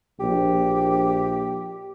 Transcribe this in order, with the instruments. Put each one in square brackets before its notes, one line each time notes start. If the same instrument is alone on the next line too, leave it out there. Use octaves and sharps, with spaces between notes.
[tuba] A#1 [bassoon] G4